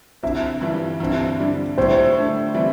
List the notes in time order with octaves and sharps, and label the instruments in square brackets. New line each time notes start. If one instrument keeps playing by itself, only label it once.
[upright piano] D3 C4 E4 [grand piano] E5
[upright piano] G2 E3 G3
G2 D3 C4 E4
D3 G3 D4
[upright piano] A2 G3 E4 [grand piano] C5
[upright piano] D3 A3 D4
C3 E3 G3 E4